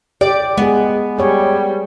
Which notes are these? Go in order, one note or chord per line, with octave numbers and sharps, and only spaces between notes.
G4 D5
G#3 B3 G#4
G3 G#4 C#5